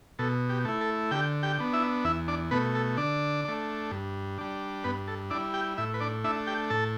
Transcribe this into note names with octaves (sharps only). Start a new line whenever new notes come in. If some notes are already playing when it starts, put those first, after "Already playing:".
B2 A4
G4
A3 E4
A4
D3 G4 G5
G4 G5
B3 D4
E4 E5
E2 E4 E5
D4 D5
B2 A3 B3 B4
A4
D3 D4 D5
A3 D4
G2
G3 D4
G2 B3 B4
A4
G3 D4 E4 D5
G4 G5
A2 E4 E5
B4
D4 D5
A3 D4 E4 E5
G4 G5
A2 A4 A5